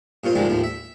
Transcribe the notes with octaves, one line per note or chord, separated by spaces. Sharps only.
G2 A#2 F4 C5 D#5
G#2 D3 D#3 F3 G3 G#3
D#2 A2 D#3 F3
E5